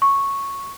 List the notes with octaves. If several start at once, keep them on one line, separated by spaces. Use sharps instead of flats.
C#6